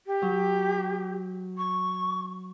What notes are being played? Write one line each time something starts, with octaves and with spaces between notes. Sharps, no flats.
G4
F#3
C#6